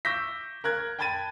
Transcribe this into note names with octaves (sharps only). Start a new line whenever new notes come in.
C#6 D6 E6 G6 A#6 B6
A#4 F#6 G#6
G5 A5 B5 G#6 A6 D#7